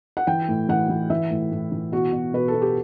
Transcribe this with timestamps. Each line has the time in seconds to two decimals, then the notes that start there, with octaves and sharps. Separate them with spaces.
0.17 F#5
0.27 E3 G5
0.48 A2
0.69 E3 F#5
0.89 E3
1.10 E3 E5
1.31 A2
1.52 A2
1.72 E3
1.92 B2 F#4
2.13 B2
2.34 B2 B4
2.48 A4
2.54 B2
2.62 G4